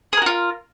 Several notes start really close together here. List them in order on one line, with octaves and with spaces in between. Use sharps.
G#4 A#4 F#4 F4